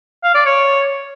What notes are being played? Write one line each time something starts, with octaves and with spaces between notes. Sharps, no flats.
F5
D5
C#5